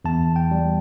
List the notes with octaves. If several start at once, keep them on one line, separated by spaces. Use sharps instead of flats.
E2 A5
G5
G3